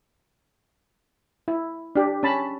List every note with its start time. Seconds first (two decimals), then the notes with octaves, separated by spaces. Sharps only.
1.48 E4
1.96 D4 G4
2.23 C#4 A5 B5